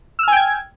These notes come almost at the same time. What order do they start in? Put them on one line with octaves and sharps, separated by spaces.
E6 F6 G#5 G5 G#6